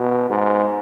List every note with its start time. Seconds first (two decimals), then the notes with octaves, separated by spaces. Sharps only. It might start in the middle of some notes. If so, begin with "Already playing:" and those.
Already playing: B2
0.30 G#2